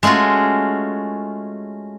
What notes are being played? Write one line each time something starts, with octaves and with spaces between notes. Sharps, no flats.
G#3 A3 C#4 F4 F#4